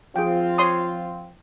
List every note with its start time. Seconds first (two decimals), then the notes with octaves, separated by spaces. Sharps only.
0.16 F3 C4 F4 G#4 G5
0.58 C#5 C6 D#6